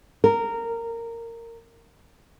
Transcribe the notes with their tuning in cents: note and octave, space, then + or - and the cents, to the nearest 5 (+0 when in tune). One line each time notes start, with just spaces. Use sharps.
A#4 -15